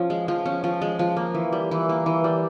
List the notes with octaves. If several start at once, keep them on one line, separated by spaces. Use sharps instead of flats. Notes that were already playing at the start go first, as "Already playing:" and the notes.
Already playing: F3 C#4
G#3
F3
C#4
F3
G#3
F3
A#3
E3
G3
E3
A#3
E3
G3